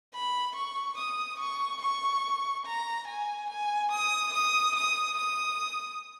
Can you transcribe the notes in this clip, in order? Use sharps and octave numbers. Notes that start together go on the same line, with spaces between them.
B5
C#6
D#6
C#6
C#6
A#5
G#5
G#5
D#6
D#6
D#6
D#6